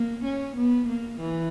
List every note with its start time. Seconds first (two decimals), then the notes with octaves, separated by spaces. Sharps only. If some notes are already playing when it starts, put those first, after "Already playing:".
Already playing: A#3
0.24 C#4
0.56 B3
0.88 A#3
1.20 E3